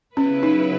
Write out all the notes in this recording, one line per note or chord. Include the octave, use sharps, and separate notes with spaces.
C#3 F#3 B3 C#4 E4 B4
D#4